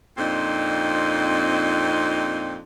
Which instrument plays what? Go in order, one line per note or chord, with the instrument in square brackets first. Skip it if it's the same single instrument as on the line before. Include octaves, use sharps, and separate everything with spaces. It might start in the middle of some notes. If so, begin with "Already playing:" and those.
[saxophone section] F2 A#2 C4 D4 D#4